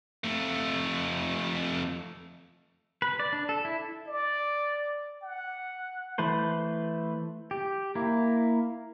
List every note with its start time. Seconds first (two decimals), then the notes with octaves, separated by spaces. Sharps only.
0.24 F2 A3
3.02 B4
3.20 D5
3.33 D4
3.49 A4
3.65 E4
4.07 D5
5.22 F#5
6.18 E3 A3 B4 C5
7.51 G4
7.95 A#3 E4